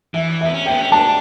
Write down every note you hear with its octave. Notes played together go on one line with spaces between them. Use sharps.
E3 E5
E5
B3
C#4
G5
B3
C#4
D4 A5